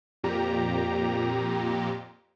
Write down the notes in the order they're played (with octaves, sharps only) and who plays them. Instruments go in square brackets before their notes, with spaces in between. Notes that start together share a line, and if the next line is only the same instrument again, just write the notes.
[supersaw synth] F2 A#2 G4 A#5